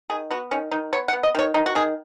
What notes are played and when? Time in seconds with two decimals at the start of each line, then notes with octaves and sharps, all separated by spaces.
0.10 D#3 G#4
0.30 B3 F#4
0.51 D#3 C#4
0.71 D#3 D#4
0.93 B3 C#5
1.08 F#5
1.13 B3
1.23 D#5
1.35 D#3 C#5
1.54 D#3 D#4
1.66 F#4
1.75 D#3 G#4